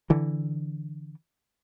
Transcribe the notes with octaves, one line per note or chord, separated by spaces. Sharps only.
D3 E3